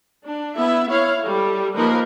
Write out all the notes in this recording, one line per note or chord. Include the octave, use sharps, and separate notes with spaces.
D4
B3 E4 E5
E4 C#5 F5
G3 A4
F3 A#3 D#4 A#4 B4